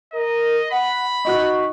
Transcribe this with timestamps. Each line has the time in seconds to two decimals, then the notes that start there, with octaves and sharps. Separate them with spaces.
0.13 A#4 D#5
0.71 F#5 B5
1.25 D#4 F#4 C#6 F#6